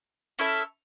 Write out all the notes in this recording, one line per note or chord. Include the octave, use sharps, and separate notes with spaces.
C#4 E4 A4 E5